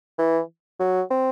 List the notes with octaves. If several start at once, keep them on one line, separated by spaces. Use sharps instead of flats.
E3
F#3
C4